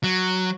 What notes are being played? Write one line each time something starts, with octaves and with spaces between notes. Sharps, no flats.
F#3